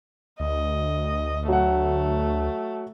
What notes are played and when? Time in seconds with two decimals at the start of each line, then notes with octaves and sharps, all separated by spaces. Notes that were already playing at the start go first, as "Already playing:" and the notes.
0.40 D2 D#5
1.48 F#3 A3 F#5